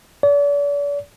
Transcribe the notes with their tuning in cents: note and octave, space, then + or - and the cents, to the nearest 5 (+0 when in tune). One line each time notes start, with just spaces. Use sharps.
D5 -40